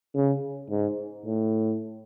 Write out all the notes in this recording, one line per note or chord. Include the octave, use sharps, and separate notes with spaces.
C#3
G#2
A2